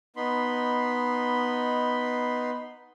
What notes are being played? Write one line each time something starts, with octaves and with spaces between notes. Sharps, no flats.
B3 D#4 B5 C6